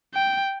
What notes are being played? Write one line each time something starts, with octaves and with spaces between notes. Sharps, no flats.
G5